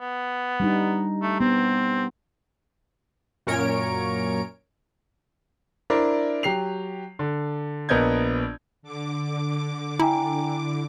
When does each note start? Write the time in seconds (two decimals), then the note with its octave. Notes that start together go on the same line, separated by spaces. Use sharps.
0.01 B3
0.60 G3 D4 D#4
1.22 A3
1.41 B3 C4
3.47 F#2 A#2 C#4 A#4 C#5 D7
5.90 D4 E4 A#4 C5 D5
6.43 F#3 G4 C7 F7
7.19 D3
7.89 A#1 B3 A#4 D#5 G6 G#6
8.82 D3 D6
9.99 E4 G5 G#5 A#5